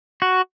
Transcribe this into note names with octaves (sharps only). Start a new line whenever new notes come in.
F#4